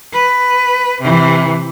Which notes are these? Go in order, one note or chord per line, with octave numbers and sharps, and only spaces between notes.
B4
C3 E3